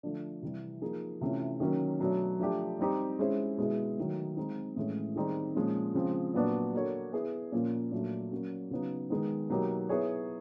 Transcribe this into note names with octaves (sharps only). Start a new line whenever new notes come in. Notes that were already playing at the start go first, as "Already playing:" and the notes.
D3 F3 A3
C3 E3 G3
F3 A#3 D#4 G#4
C3 E3 A3 C#4 F4
D#3 F#3 A#3 C#4
B2 F#3 A3 D4
F3 A3 D4 G4
G3 C4 D#4 G4
G#3 C#4 E4 G#4 C5
B2 G#3 B3 E4 G#4
D#3 F#3 A3
G#3 C4 D#4
A2 E3 G#3 C#4
D#3 G3 C4 D#4 G#4
A#2 F3 G#3 C#4
C#3 F3 G#3 C4
A#2 F#3 B3 D4 F#4
A#3 D4 F#4 A4 C#5
B3 E4 G#4
A#2 F3 A#3 C#4 F4
A#2 F#3 A3 D4
F#3 A#3 C#4 F#4
C#3 F#3 B3 D#4
D#3 G#3 B3 D#4
B2 F#3 A#3 D#4 G4
B3 E4 G#4 C#5